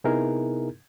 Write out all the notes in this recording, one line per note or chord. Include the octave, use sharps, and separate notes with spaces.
C3 B3 D#4 E4 G#4 A#4